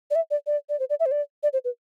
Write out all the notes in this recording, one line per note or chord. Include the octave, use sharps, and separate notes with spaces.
D5
E5
D5
D5
D5
C5
D5
E5
C5
D5
D5
C5
B4